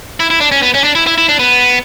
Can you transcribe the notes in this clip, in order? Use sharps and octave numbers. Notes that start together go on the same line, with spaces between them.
E4
E4
D4
C#4
B3
C#4
D4
E4
E4
E4
D4
B3